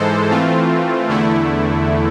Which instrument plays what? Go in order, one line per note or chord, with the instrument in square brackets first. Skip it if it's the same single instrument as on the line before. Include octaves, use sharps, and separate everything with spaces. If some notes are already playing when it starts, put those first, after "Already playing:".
Already playing: [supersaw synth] G#2 E3 G#3 A4 C5
E3 A3 C4 F4
E2 D3 A3 E4